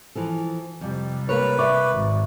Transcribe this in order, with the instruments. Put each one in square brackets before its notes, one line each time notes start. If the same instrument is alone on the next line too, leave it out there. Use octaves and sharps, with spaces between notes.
[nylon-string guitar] E3 F3 A4
[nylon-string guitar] F2 [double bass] C3 G3
[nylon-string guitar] A#3 A#4 C#5 [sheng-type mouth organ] B4
[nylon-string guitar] D5 [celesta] E5 C#6 D6
[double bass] G#1